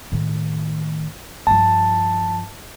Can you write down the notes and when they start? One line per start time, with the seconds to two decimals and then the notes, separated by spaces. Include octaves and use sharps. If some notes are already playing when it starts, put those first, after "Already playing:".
0.12 A2 D#3
1.47 G2 F3 A5